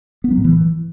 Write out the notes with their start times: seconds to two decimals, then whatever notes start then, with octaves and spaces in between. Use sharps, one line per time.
0.24 B3
0.31 F#3
0.38 A2
0.44 E3